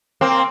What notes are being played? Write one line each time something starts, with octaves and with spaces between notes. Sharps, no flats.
A#3 C4